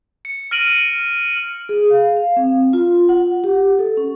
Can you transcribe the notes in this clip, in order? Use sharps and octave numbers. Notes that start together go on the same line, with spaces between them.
C#7
F6 A#6 D7 D#7 F#7
G#4
F5
F5
C4
F4
F#5
G4
A4
C#4